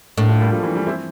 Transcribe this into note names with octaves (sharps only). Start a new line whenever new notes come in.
A2 A#3 D4
D4 F4
G3 A#3
F3 A3
E3 G3
E3 G3
C4 E4